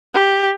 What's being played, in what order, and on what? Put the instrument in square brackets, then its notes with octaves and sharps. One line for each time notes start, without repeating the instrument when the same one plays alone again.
[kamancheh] G4